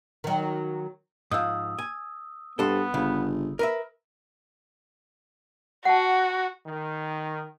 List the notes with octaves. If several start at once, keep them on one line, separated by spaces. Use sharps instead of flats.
D#3 F#3
G#2 F3 D#6 E6
G#5
G2 B3 A4 C5
G1 C#3
A#4 B4 E5
F#4 F#5 A5
D#3